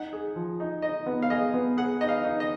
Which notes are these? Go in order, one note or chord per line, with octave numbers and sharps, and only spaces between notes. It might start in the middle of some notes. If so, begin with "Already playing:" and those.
Already playing: D#4 F#5
G#4
F3
D#4
D#4 D#5
B3
F5
G#4 D#5
B3
G#4 F#5
D#4 D#5
F5
D#4
D#5